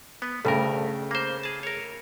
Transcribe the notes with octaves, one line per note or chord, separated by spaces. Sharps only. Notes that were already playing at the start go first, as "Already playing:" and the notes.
B3 B4
D2 G2 C#3 A3 A#4
A#3 C5
G#4 A5
A#4 C#5